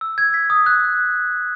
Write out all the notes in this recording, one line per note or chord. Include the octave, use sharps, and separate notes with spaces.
E6
G#6
B6
D#6
F#6